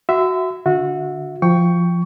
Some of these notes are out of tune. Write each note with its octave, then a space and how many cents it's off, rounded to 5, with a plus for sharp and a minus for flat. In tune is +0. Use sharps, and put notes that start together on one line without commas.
F#4 +0 E5 +0 C6 -40
D3 +0 F#4 -25 E5 +0
F3 -10 G5 +0 C#6 +15